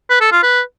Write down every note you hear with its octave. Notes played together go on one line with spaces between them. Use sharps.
B4
A4
F4
B4